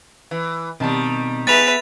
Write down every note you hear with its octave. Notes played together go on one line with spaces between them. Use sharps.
E3
B2 D#3 G3 C4 A5
B3 G#4 B4 E5 A6 F7